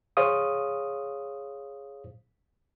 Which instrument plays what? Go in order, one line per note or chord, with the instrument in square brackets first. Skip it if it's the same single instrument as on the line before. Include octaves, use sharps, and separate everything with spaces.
[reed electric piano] G#4 C5 C#5 F5 D#6